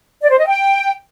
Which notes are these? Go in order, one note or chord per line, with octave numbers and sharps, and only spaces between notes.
D5
C5
D#5
G5